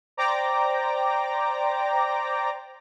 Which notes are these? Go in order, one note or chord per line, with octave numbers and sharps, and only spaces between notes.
C5 D5 G5 A#5 D6 A#6